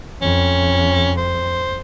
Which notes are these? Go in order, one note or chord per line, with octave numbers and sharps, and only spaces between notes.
F2 C#4
C5